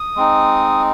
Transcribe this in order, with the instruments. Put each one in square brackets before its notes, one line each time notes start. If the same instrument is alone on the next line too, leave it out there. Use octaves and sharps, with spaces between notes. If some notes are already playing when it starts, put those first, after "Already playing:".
Already playing: [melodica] D#6
G#3 C4 D#4